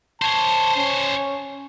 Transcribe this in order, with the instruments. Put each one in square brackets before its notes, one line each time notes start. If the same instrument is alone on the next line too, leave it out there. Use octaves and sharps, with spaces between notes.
[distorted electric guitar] C5 C#5 [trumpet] A5
[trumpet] C#4